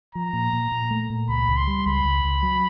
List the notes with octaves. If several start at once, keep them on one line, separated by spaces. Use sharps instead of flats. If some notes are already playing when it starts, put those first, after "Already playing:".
F3 A#5
A#2
A#2
A#2
A3
A#2
C#2 B5
C#2
C6
G3
C#2 B5
C#2
C#2
F#3